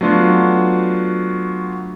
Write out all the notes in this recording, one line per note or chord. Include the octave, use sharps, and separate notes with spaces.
F#3 A3 B3 D4 F4 F#4